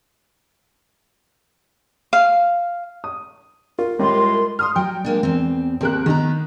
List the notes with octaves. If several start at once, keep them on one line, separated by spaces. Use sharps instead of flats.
F5
D#6
F4 A#4
A2 G3 G#3 F4 C6
C6 D#6 F6
F#3 G5
G#3 A#3 D4
E2 C4
D#2 C4 A#4 F#6
D#3 B3 D#4 A#5